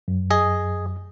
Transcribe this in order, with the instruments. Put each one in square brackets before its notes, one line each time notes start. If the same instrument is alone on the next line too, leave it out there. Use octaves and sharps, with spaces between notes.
[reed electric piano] F#2
[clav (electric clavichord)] G#4 D#5